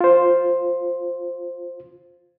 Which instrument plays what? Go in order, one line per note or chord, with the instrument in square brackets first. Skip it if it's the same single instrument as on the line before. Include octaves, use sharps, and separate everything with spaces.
[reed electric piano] F4 C5